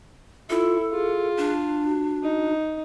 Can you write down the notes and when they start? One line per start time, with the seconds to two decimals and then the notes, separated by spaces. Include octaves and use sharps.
0.50 E4 F4 A4
0.91 F4 G#4
1.37 D4
1.86 F#4
2.24 D#4